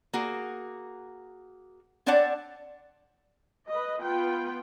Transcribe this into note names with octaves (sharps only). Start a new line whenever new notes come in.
A#3 F#4 G#4
C4 D4 C#5 D5 F#5 A5
B4 D#5
B3 F4 B4 G5